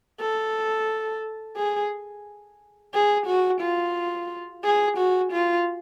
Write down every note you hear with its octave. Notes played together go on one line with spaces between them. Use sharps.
A4
G#4
G#4
F#4
F4
G#4
F#4
F4